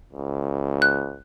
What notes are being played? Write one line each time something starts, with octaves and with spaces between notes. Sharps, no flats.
C#2
F#6